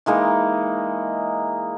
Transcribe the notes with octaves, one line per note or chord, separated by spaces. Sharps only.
E3 G#3 A#3 D#4